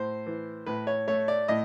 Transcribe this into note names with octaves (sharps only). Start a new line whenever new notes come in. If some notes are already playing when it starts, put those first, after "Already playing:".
Already playing: A2 C5
E3
A2 B4
C#5
A3 C#5
D5
A2 D#5